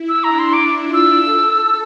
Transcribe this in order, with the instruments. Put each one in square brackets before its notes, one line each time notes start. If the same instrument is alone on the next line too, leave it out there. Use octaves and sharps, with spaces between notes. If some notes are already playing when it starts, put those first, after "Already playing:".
Already playing: [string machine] E4
[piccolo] E6
[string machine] D4 [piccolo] A#5
[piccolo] C6
[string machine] E4 [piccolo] D6
[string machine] F4
[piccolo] E6
[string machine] A4